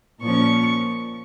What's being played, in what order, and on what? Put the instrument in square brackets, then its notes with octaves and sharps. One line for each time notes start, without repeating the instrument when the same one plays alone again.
[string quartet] A#2 F3 C#4 C#6